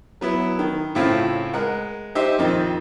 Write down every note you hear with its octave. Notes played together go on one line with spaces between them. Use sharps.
F#3 B3 E4
D#3
A2 C#3 C4 E4 F4
G#3 A#4 F#5
D#4 G4 C5 E5
F2 A#2 D#3 C4